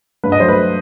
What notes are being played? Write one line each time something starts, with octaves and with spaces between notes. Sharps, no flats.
G2 B4
D#5
F#3 A3 C5
B4